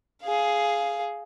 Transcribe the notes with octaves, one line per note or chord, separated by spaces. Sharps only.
G#4 F5